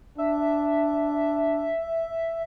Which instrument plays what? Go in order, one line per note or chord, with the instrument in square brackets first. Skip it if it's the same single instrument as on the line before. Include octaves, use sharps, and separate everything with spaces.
[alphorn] D4 [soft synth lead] E5